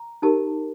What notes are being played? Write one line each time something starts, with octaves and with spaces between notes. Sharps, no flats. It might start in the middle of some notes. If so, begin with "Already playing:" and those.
Already playing: A#5
D#4 G4 A#4 A5